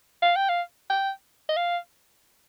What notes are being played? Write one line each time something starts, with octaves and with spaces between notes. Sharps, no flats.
F5
G5
F5
G5
D#5
F5